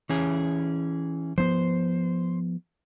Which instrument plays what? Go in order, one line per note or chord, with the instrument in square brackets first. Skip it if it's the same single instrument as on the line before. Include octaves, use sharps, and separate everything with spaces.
[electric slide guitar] E3 C#4 G#4
[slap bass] F3 B3 [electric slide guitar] C5